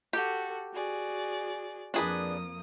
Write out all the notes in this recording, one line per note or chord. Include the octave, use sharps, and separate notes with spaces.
F#4 G4 A4
F#4 G#4 D5
F2 A#3 D4 G#4 B4 D#6